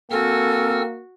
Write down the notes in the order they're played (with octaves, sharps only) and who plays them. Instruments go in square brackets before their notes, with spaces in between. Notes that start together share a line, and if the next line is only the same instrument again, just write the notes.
[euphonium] A#3 [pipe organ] C4 E6 F6 [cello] F#4 [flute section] A4 G#5